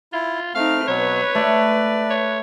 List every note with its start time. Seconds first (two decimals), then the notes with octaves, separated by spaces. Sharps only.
0.13 E4 F4
0.55 A3 C4 D#4 F5 F6
0.88 B2 F#3 B4 C#5
1.35 A3 D5
2.10 C#5